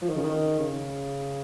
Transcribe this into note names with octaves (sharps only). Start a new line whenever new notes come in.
F3
D#3
C#3
D#3
C#3